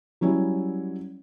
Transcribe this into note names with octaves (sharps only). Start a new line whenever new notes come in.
F#3 G3 C#4 E4